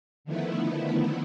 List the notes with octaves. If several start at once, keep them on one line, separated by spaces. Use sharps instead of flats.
D3 D#3 F3 A3 B3 E4